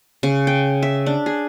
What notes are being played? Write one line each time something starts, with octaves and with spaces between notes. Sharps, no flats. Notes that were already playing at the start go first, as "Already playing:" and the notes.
C#3
G5
E5
D4
G#4